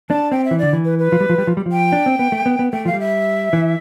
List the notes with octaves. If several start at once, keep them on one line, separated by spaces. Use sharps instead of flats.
D4 A5
C4 G5
E5
E3
D3 D5
E3
B4
B4
F3
G3
F3
G3
F3
G3
F3
G5
D4
C4
B3
A3
B3
B3
A3 G5
F3 F5
G3
E5
E3